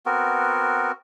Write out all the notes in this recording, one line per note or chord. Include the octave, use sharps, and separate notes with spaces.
B3 C4 F#4 A#4